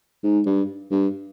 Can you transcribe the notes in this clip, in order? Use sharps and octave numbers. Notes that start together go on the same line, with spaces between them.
G#2
G2
G2